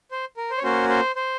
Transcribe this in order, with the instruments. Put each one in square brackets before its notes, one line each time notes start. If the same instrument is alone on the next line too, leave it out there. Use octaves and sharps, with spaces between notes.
[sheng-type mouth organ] C5
A#4
C5
C#5
A#3 C#4 F#4 C5
C5
C5